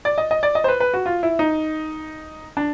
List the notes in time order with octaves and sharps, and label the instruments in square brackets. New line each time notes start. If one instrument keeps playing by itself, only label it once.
[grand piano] D5
D#5
D#5
D5
D#5
C5
B4
B4
F#4
F4
E4
D#4
D4